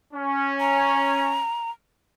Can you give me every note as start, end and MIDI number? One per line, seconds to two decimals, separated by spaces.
0.14 1.42 61
0.60 1.70 82